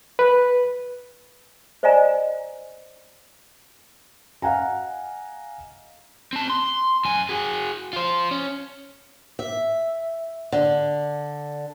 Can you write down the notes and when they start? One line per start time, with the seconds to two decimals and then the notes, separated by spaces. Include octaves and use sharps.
0.19 B4
1.83 C5 D5 D#5 F5 G#5 A#5
4.42 D#5 F5 F#5 G#5 A#5
6.33 C4 A5
6.50 C6
7.05 F#2 G#5
7.29 F#4 G#4
7.93 F4 C5
8.31 C#4
9.39 E5
10.52 D3